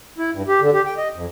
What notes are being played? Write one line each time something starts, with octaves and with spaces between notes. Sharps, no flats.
E4
G2
G4
D3
G4
G5
D#5
F2